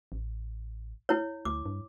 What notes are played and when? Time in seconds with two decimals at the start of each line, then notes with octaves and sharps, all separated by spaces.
0.12 A1
1.09 E4 C#5
1.45 D2 D6
1.66 G2